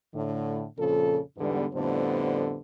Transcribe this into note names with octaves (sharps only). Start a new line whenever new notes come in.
A2 D3
F2 A#2 C#3 F3 A4
E2 G#2 D3 G3 B3
F2 A2 D3 G3 B3 C5